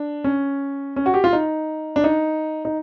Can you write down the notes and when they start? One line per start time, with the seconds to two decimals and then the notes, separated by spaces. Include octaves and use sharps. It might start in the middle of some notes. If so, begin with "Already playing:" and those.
Already playing: D4
0.24 C#4
0.96 C#4
1.06 F#4
1.14 G4
1.24 F4
1.33 D#4
1.96 D4
2.04 D#4
2.65 D#4